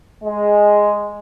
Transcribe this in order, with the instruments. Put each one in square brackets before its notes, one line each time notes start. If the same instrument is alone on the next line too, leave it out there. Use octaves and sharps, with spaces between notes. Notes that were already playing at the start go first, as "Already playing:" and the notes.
[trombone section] G#3